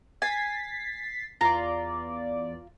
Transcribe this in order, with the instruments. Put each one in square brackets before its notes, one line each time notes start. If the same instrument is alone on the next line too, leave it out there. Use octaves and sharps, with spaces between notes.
[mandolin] G#5 [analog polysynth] A6 B6 C7
[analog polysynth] E2 D5 [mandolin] F4 A#5